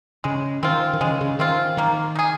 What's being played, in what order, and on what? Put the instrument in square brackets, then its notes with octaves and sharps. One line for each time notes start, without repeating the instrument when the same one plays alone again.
[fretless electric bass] C#3 [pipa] G#3
[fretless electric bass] D#3 [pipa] C4 F4
[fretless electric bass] D#3
[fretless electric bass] C#3 [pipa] G#3
[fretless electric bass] C#3
[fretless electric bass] D#3 [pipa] C4 F4
[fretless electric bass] D#3 [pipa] A#3
[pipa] D#4
G#4